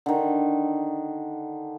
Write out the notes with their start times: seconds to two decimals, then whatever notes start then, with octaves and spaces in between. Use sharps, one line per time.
0.06 D3 D#3